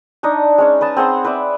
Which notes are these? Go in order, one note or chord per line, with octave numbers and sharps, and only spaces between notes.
D4 D#4 C#5 D#5
G#3 C#4 C#5
B4 D#5 A5
C4 G#4 F#5 C6
B4 D5 E5